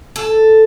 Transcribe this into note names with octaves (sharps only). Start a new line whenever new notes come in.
A4